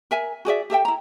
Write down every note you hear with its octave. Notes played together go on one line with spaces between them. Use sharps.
A#4 E5 G#5
F#4 G#4 D5 E5
G4 A4 E5 G5
E4 A#5